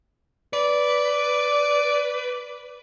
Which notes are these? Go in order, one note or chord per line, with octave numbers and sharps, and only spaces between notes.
B4 D5